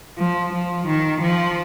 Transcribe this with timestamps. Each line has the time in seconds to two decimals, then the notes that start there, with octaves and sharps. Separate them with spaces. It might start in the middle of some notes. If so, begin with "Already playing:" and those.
0.18 F3
0.53 F3
0.87 D#3
1.21 F3